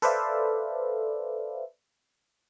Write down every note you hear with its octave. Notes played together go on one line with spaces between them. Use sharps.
A4 B4 C5 D5 E5 F5